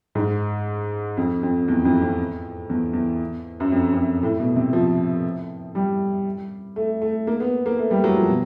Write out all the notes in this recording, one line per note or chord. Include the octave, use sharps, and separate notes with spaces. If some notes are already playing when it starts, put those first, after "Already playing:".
G#2
F2
F2
E2
F2
F2
E2
E2
F#2
F2
F2
F#2
A2
B2
C3
F3
G3
A3
A3
A#3
B3
A#3
A3
G3
F#3
F3
B2